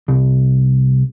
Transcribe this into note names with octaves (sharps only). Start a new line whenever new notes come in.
C2